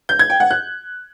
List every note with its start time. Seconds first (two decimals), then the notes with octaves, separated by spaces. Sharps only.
0.09 G6
0.19 G#6
0.30 G5
0.40 F#5
0.51 F#6